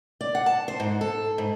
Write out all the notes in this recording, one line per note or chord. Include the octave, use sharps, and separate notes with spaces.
D5
F#5
A5
C5
G#2
A4
G#2